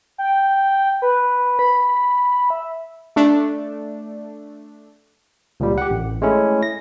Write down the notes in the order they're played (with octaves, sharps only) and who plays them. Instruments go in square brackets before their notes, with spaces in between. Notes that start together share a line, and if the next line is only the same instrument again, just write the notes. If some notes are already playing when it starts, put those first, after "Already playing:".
[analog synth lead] G5
B4
B5
E5
[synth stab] A3 D4
[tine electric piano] C#2 A#2 G3
G4 F#5
A1
G#3 A3 C#4 E4
A#6